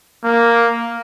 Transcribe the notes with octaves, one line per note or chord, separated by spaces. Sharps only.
A#3